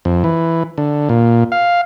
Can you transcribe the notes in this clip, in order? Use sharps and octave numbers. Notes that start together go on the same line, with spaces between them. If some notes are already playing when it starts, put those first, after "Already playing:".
F2
E3
D3
A#2
F5